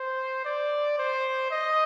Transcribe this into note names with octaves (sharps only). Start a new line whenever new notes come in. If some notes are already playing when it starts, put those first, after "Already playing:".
Already playing: C5
D5
C5
D#5